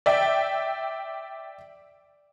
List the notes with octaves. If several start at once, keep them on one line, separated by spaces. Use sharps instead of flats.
D5 E5 G5